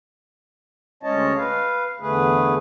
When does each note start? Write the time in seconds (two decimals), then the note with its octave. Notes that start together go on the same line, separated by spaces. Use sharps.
1.03 D2 G#3 C#4 C#5 D#5 A5
1.36 B4 F5
2.00 E2 D3 A3 G#4 B4